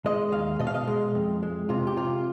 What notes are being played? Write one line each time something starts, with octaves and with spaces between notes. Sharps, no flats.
G#3 D#5
D#2 F5
B2 D#5
F5
D#5
G#3
F2
G#3
C3 F4
G4
C3 F4